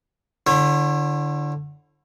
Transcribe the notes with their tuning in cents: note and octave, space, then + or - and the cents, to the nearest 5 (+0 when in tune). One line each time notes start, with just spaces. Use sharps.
D3 +0 E4 +25 C#5 -35